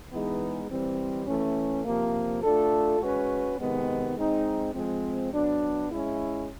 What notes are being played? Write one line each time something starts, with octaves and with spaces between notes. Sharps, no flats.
E3 G#3 B3 D#4 G#4
E3 G3 C4
E3 A3 C#4
C3 F3 A#3
A3 D4 F4 A4
G#3 C#4 F#4 B4
C3 D#3 G#3 B3
G#3 C4 D#4
F3 G#3 C4
F#3 B3 D4
G#3 C#4 E4